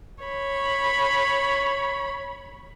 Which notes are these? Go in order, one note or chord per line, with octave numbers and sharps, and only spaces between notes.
C#5 B5